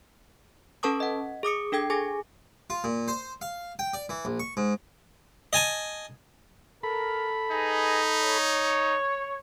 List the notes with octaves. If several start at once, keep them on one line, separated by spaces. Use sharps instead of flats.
C#4 A4 B4 A5 C#6 D#6
D#5 F#5
G#4 D6 D#6 C#7
D4 A4 G5 G#6
G#4 G#5 D6 A#6
F4
A#2
C5
F5
G5
D5
E3
A#1
C#6
G#2
D#5 G#5 A5
A4 A#4 B5
D#4 G#4 B4 D#5
C#5